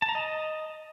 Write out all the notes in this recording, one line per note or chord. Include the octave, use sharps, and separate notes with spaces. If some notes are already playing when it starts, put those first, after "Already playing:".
A5
A#5
D#5